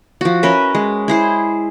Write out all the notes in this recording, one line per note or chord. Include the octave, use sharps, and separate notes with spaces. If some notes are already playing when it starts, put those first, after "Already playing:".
F3 F#4
C#4 A#4 B4 E5
G#3
E4 G#4 C5